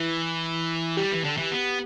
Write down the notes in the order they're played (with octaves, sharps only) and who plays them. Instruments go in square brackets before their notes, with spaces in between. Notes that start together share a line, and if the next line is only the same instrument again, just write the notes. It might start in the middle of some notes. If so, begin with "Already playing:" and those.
Already playing: [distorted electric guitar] E3 [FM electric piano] E4
[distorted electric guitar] G3 [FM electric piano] G4
[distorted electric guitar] E3
D3
E3
B3